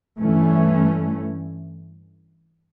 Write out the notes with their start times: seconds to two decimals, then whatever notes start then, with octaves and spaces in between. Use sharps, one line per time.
0.18 G2 E3 A3 C#4